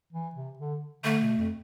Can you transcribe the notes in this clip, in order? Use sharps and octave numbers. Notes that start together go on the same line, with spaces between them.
E3
C3
D3
D3 A3
B2
F2